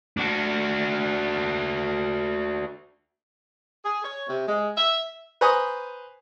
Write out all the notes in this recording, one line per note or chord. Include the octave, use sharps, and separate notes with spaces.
D4 F#4
G#4
C#5
C3
G#3
E5
B4 C5 G#5 A#5 C#6 D#6